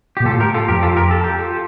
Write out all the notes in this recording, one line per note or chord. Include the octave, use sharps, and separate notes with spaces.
A#2 G4
A2 F4 A4
G4 A#4
F4 A4
F2 G4 A#4
F4 A4
G4 A#4
A4
G4
F4 A4